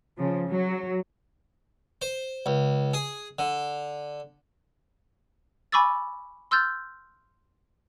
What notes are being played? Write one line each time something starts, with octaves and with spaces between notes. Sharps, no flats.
C#3 F3
F#3
C5
C#2
G#4
D3
G#5 B5 C#6 D6 E6 A6
C6 E6 F6 G6 A6